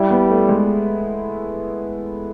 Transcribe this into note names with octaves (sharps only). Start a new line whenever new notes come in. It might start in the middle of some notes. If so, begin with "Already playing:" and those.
Already playing: G3 E4
B3
A3
G#3